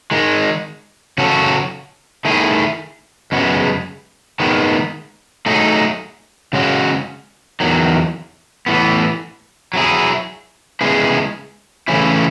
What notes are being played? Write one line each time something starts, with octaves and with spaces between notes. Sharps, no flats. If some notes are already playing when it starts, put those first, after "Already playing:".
D#3 G#3 D#4
C#3 F#3 C#4 F#4 A4
D#3 A3 E4 G#4
F#2 C#3 G#3 B3
D#3 G#3 B3
F#3 A3 D#4 G#4
C#3 G#3 C#4 F#4
E2 D#3 F#3
A2 E3 B3
F#3 B3 E4 G#4
C#3 G#3 B3 E4 G#4
C#3 E3 A3 C#4 E4